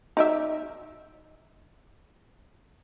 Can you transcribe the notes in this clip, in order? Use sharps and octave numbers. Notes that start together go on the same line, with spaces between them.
D#4 D5 E5